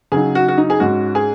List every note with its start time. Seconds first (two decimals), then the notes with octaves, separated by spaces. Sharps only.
0.12 C#3 F#3 D#4 G#4
0.35 F#4
0.48 F#4
0.58 D#4
0.70 G#4
0.80 G#2 G#3 C#4 F#4
1.15 G#4